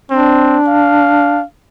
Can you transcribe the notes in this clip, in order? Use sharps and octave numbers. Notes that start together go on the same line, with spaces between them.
C4 D4
F5